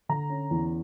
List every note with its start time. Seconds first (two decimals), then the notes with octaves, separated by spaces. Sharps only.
0.09 D3 A#5
0.30 C#4
0.51 E2